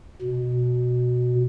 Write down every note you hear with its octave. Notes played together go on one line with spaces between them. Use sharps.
B2